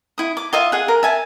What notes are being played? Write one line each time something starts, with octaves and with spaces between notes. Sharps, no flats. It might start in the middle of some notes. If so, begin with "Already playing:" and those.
E4 D#6
D6
F4 D#5 E5
G#4 F#5
A#4
E5 G#5 A5